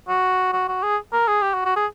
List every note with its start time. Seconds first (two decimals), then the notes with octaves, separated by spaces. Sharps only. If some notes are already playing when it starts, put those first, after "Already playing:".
0.08 F#4
0.52 F#4
0.68 F#4
0.83 G#4
1.12 A#4
1.27 G#4
1.42 G4
1.54 F#4
1.65 F#4
1.76 G#4